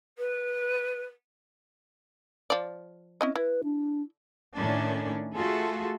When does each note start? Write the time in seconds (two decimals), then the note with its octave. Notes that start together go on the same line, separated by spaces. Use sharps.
0.18 B4
2.50 F3 D5
3.21 C4 C#4 E4 D#5
3.36 E4 B4
3.64 D4
4.56 A2 D#3 C#4 D4
5.35 A3 F4 F#4 G#4 A4